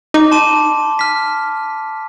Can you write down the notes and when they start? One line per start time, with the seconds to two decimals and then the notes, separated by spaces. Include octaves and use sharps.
0.14 D#4 D6
0.32 A5 C6 D#7
0.99 F6 B6